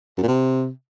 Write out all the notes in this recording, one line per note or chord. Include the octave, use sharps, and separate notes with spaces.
F#2
A#2
C3